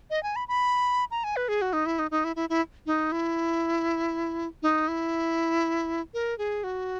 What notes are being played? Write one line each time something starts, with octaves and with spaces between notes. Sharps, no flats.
D#5
G#5
B5
B5
A#5
G#5
B4
G#4
F#4
D#4
E4
D#4
D#4
E4
E4
E4
D#4
E4
D#4
E4
A#4
G#4
F#4